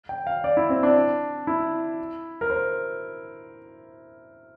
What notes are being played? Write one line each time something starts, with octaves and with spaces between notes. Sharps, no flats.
G5
F5
D5
E4
C4
D4
E4
A#4
C5